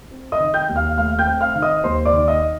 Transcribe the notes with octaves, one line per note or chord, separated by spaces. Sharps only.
C4
D#5 D#6
D#3
G5 G6
D#2
F5 F6
A3 F5 F6
G5 G6
C4
F5 F6
D#3
D#5 D#6
D#2 C5 C6
D5 D6
D#3
D#5 D#6